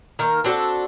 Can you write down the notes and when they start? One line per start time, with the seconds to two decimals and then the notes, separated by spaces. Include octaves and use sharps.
0.19 D#3 A#3 A#4
0.44 C4 D4 F#4 A4